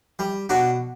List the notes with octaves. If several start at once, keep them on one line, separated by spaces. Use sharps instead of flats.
G3
B2 D4 F#4